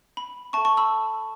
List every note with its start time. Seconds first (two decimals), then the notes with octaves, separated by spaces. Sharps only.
0.17 B5
0.53 E5 A5 C#6
0.57 A4
0.65 A5 C#6
0.77 B5 E6